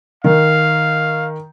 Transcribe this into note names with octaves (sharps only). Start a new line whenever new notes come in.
D#3 F5